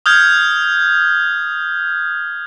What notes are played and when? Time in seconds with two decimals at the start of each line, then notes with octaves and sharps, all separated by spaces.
0.06 D#6 F6 G6 G#6